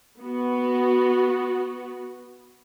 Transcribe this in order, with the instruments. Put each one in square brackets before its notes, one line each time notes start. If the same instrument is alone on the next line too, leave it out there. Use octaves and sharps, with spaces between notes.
[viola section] B3 F#4